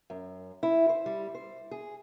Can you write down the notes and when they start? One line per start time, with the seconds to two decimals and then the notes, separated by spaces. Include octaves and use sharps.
0.10 F#2
0.63 E4
0.89 C5
1.06 G3
1.34 C5
1.71 G#4